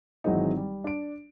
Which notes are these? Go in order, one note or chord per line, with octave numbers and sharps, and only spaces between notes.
G#1 E3 F#3 G#3 C4 D#4
G3
D4 D7